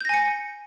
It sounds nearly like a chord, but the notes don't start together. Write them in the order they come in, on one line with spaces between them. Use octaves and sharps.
G6 A#6 G#5 C#7